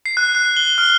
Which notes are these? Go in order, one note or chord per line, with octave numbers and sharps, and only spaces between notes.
C7
F#6
F#6
G7
F6